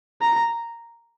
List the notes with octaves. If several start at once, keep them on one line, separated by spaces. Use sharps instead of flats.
A#5